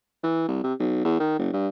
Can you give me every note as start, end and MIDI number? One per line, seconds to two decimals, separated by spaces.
0.24 0.46 52
0.48 0.60 36
0.64 0.73 48
0.80 1.04 35
1.04 1.18 40
1.20 1.36 51
1.39 1.51 30
1.53 1.68 43